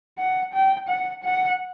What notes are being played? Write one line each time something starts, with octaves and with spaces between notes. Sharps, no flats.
F#5
G5
F#5
F#5